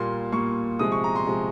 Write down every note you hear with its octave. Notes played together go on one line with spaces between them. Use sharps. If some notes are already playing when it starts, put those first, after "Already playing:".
Already playing: A#2 G3 A#3 C6
A#2 G3 A#3 C#6
C3 F3 G#3 D#6
C#6
A#5
C6
C3 F3 G#3